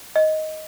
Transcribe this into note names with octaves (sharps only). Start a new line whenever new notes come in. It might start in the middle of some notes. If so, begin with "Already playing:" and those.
D#5